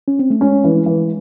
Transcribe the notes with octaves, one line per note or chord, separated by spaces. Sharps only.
C#4
C4
A3
G#3 C#4
E3
E3